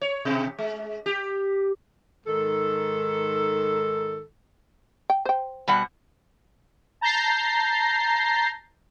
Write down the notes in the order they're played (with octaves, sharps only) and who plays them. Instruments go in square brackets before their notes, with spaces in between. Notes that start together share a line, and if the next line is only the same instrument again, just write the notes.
[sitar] C#5
B2
G#3
G4
[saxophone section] G#2 D#3 A4
[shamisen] G5
C5 G5
[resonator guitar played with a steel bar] B2 G3 F#5
[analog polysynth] A5 A#5 G6 A6 A#6 C7